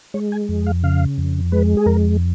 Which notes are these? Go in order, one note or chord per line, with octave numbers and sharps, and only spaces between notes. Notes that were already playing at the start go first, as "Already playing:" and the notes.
G#3 C#5
G#5
F2
F5
C#3 F5
F2
G#3 B4
G#4
F2 A#4